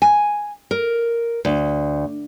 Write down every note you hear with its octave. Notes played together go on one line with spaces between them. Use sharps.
G#5
A#4
D2